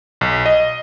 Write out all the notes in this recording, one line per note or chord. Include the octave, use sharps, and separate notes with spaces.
B1
D#5